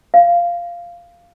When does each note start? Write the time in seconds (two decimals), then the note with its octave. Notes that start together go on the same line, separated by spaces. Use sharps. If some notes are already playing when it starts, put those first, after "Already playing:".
0.14 F5